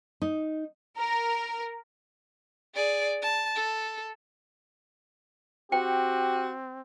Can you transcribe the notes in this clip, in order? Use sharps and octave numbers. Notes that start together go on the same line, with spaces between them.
D#4
A#4
G#4 D5
A5
A4
C4 F#4 G4 G5